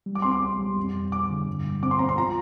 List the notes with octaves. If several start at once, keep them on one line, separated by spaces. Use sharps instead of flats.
G3
D6
C4 C6
D6
C2
G3
F2
F2
F2 D6
D3
G2
G3
C4 D6
C6
C4 A#5
C6
F4 A#5